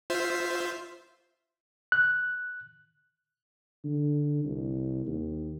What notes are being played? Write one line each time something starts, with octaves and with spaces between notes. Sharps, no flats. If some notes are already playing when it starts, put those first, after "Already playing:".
F4 C5 E5
F#6
D3
C2
D#2